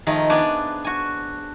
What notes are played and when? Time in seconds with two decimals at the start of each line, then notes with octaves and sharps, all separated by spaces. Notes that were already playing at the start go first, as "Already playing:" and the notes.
0.07 D#3 F3 A3 D#4 G#4
0.30 B3 D4 G#4 D5 G#5 A5
0.84 F#4 G#5